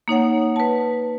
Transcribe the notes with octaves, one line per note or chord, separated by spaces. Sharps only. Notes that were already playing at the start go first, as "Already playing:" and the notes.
A#3 D#4 C#5 F#5
B4 A5